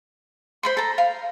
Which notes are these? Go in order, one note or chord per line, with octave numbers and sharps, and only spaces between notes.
C5 B5 C6
A4 A#5
F5